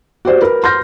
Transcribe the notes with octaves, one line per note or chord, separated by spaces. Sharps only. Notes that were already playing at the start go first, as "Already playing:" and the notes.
F#4 G4 C5 D5
A#4 B4
C6 F6 G6 A#6